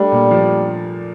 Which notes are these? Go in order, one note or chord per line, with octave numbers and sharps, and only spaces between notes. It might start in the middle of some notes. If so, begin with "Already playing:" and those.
Already playing: G3 A3 D4
A#2
F3